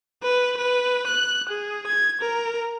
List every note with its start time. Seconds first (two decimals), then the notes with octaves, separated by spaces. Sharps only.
0.23 B4
0.57 B4
1.07 F#6
1.49 G#4
1.87 G#6
2.21 A#4